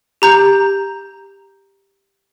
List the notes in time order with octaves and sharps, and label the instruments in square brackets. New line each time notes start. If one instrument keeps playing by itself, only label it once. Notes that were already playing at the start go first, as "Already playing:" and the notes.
[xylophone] G4 A#5 G6